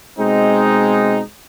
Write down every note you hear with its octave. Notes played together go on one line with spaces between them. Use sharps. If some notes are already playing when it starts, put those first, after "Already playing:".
B2 G#3 C4 D#4